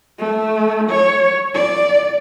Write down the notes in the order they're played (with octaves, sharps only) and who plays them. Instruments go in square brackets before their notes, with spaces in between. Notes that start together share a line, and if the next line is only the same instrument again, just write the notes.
[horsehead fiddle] A3
C#5
D5